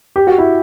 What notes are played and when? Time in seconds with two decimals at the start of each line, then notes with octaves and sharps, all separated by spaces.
0.16 G4
0.27 F#4
0.38 E4